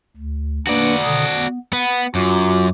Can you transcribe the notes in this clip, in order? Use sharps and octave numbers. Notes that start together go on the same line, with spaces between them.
D2
A#3 D4 F#4 B4 D5
B2 D3 D#6
B3
B3 F#5
F#2 F4 F#4 D6